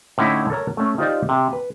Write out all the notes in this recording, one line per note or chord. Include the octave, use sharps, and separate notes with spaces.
A2 D3 C#4 D#4 E4
A4 A#4 C#5 A#5
A3 C#4
D#4 F4 G4 C5 D5 D#5
C3
B4